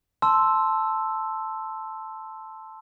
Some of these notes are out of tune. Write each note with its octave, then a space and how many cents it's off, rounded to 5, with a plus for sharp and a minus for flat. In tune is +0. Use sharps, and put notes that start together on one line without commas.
A5 +0 C6 +0 E6 +0